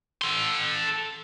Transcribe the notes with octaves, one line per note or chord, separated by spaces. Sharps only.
A4 C6